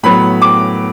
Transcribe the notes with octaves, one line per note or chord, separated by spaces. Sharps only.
A2 F#3 B3 B5
D6